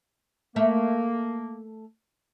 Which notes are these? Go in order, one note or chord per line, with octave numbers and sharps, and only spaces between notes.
A3 A#3 A#4 E5